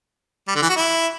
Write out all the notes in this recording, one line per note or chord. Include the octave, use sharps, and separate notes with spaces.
G3
D3
E3
F#4
E4